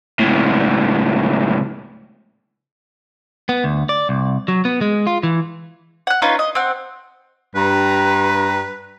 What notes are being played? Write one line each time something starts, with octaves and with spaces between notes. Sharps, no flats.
C#2 A2
B3
D2
D5
C2
F#3
B3
G#3
F4
E3
F#5 F#6
C#4 D#4 F4 B4
D#5
C4 F#5
G2 B4 A#5